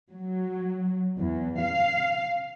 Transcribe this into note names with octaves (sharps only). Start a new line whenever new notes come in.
F#3
E2
F5